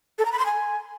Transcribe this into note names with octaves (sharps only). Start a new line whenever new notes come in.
A4
A#5
B5
C6
G#5